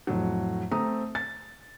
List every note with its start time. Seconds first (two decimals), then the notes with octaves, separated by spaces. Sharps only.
0.07 F2 A2 F#3
0.72 A3 C4 A#5 D#6
1.15 A6